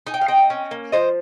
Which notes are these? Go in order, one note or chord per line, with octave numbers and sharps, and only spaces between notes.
D#4 G#5
G5
F5
C4 D#5 G5
C#4
A#3
F3 C5 D#5